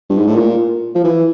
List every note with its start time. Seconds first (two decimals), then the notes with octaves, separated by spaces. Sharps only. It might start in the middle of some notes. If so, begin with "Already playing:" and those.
0.10 G2
0.18 G#2
0.27 A2
0.35 A#2
0.95 F3
1.04 E3